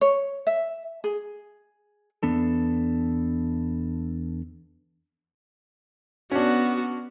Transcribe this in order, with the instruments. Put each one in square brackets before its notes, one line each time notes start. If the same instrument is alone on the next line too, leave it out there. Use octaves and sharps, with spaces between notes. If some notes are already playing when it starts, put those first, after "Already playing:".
[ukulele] C#5
E5
G#4
[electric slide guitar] E2 B3 D4 A4
[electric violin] B3 F#4 [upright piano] C#4 D4